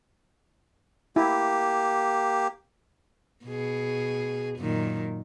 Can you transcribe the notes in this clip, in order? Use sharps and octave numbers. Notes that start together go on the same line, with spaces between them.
A#3 E4 G4
B2 G#4
F#2 A#2 D#3